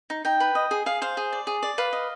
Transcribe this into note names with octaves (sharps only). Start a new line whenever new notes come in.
D#4
D#4 G5
B4
D#5
G#4
G#4 F5
C5 F5
G#4
D5
G#4
D5
B4 F5
D#5